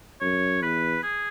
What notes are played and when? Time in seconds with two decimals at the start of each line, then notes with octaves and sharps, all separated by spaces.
0.21 F#2 C#5
0.62 E2 B4
1.03 G#4